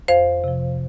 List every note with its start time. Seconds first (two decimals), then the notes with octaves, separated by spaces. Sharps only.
0.08 F2 C5 F5
0.44 C3 F3